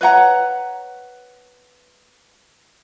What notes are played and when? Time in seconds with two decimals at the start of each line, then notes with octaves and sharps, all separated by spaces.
0.01 B4 C#5 F#5 A#5